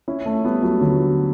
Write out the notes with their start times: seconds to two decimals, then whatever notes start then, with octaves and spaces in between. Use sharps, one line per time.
0.08 C#4 E4
0.26 A3 C#4
0.45 G3 B3
0.63 F#3 A3
0.81 D3 F#3